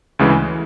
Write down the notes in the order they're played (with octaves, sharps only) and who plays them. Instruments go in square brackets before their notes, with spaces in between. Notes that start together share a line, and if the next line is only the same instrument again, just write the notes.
[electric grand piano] D2 C#3 E3 G#3